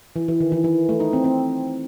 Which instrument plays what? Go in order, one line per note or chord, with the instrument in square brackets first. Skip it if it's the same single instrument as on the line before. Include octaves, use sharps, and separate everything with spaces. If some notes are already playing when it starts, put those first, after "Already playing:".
[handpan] E3
E3
D#3
E3
E3
A3
D#4
C4
C4